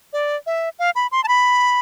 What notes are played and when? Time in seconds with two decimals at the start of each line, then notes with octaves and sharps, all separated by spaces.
0.13 D5
0.46 E5
0.79 F5
0.95 B5
1.12 C6
1.24 A5
1.28 B5